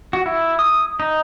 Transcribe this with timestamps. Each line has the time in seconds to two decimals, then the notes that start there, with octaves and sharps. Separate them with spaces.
0.13 F#4
0.26 E4
0.59 D#6
1.00 D#4